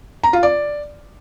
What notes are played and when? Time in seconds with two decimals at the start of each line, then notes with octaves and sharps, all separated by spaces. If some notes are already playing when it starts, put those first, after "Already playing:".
0.23 A#5
0.33 F4
0.43 D5